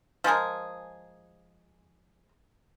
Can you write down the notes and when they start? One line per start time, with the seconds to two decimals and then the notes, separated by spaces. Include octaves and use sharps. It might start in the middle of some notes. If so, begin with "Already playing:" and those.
0.24 F3 G#3 G#4 A#4